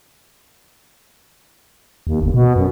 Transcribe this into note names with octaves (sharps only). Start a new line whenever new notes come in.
D#2
G1
B2
F#2